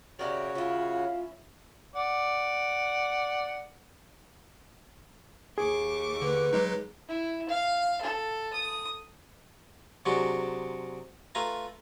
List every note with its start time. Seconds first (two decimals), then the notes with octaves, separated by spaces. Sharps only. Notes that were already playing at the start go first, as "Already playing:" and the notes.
0.19 C#3 E4 F#4 G4 A#4 C#5 D5
0.55 C#4 E4 F4 F5
1.96 D5 F#5
5.58 D#2 G#4 C#6 D6
6.22 D3 B4
6.53 F#3 G#3 D#4
7.08 E4
7.49 F5
8.01 A4
8.53 D#6
10.06 C3 F#3 G#3 D4 F#4
11.35 A3 F4 B4 G#5 A#5